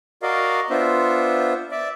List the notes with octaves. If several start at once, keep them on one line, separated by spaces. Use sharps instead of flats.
F#4 A#4 D5 D#5 F5
B3 D4 F4 C5 E5
D5 E5